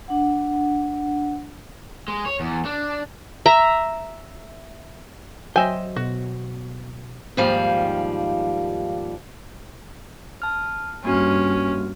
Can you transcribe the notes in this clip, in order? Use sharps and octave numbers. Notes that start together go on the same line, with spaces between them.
D4 F#5
G#3
C#5
E2
D4
E5 A#5
F#3 C5 D#5 E5 G5 G#5
B2 F#4
D#2 G#2 F3 G3 F5
A5 F6
G2 A#3 C#4 F#4 F6